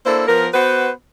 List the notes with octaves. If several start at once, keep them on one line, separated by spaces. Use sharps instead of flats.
A#3 D4 E4 A4 C5
F3 B3 A#4
B3 F#4 B4 C5